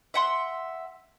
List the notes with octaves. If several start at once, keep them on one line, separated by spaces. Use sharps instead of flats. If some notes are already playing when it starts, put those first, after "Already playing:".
E5 F#5 C6